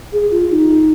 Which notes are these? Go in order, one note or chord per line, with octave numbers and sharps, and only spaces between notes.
G#4
F4
D#4